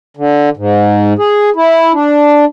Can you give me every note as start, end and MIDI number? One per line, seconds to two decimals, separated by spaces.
0.17 0.49 50
0.57 1.13 44
1.19 1.50 68
1.56 1.92 64
1.93 2.45 62